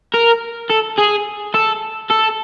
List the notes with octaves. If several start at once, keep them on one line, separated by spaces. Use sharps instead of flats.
A#4
A4
G#4
A4
A4